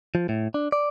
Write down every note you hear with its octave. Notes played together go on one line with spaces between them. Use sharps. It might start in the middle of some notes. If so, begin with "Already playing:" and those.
F3
A2
D4
D5